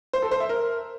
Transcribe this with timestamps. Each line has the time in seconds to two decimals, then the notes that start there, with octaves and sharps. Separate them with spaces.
0.13 C5
0.22 A4
0.31 C5
0.40 E5
0.49 A#4